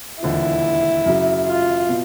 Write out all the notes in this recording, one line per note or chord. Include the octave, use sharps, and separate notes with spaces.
E1 D#2 D3 F3 E4
F#2 C#3 F#3
F4
B2